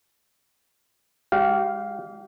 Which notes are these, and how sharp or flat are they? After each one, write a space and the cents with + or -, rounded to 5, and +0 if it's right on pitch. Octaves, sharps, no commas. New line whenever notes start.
G#3 -30 G4 -35 F5 +0